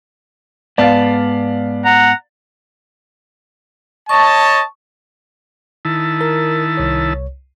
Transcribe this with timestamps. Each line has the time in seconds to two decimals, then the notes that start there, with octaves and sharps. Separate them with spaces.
0.78 G#2 B3 D5 F5 A5
1.85 F#5 A#5
4.09 C#5 D#5 A5 C#6
5.85 D#3 E4 A5
6.21 A#4
6.77 C2 C#5